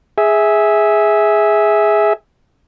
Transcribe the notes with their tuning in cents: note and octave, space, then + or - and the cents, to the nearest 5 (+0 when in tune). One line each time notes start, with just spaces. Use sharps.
G#4 +0 E5 -10